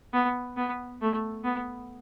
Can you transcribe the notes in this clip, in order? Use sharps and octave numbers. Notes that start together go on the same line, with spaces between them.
B3
B3
A3
B3